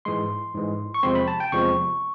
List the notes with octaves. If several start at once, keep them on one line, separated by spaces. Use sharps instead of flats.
G#2 E3 G#3 C6
G#2 E3 G#3
C#6
E2 C3 F3 G#3 C4 C6
B5
A5
G5
E2 C3 F3 G#3 C4 C#6